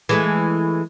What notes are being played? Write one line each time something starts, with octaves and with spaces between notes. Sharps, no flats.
E3 G#3 A3